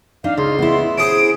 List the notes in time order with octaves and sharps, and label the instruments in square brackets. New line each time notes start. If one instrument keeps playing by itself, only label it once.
[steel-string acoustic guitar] D4 D#4 [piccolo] F5
[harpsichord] C#2 [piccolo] C6
[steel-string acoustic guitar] B3 E4
[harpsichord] C#4 G#4 C5 [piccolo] D7